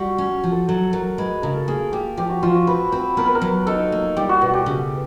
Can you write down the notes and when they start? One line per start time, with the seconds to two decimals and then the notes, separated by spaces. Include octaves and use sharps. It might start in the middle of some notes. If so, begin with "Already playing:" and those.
Already playing: G3 F#4
0.18 C#4
0.44 F3
0.52 A4
0.68 F#3 A4
0.93 F#3 A#4
1.18 G#3 B4
1.42 C#3 A#4
1.56 A4
1.68 A#3 G#4
1.92 A#3 G4
2.17 F3 G4
2.30 F#4
2.43 F3 F4
2.54 F#4
2.67 C4 B4
2.92 C4 B4
3.17 B3 A#4
3.26 B4
3.35 A#4
3.41 F#3
3.66 D#4 A4
3.92 A#3
4.17 G3 G4
4.29 F#4
4.41 B2 F#4
4.54 G4
4.66 C#3